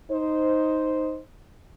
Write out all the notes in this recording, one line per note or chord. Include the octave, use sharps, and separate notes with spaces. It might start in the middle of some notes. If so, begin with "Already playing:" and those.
D#4 C5